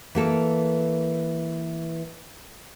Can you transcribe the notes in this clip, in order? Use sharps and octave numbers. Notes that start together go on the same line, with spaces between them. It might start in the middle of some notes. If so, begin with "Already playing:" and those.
E3 A#3 A4